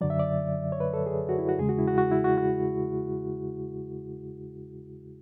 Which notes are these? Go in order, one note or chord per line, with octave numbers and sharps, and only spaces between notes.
F#2 D3 F#3 D5
E5
D5
C#5
B4
A4
G#4
F#4
E4
F#4
E2 C#3 G#3 G#4
F#4
E4
F#4
F#4
E4
F#4
F#4